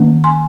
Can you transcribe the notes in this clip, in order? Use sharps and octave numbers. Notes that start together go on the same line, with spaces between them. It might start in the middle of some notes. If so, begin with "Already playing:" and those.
Already playing: D#3 A#3 C#4
G#5 C6